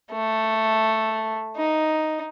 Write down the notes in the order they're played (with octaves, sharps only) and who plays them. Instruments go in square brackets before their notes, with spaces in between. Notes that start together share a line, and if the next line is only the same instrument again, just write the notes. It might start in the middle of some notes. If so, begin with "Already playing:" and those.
[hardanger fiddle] A3
D#4